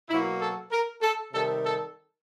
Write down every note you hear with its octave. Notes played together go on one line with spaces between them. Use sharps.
B2 F#3 A#3 E4
A4
A#4
A4
C3 D#3 G3 A4
A4